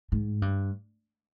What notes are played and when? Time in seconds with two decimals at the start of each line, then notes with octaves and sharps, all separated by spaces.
0.12 G#2
0.42 G2